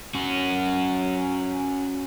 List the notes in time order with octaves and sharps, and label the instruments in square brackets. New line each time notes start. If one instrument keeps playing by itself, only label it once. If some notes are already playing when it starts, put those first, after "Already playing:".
[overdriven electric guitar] C#4 F#4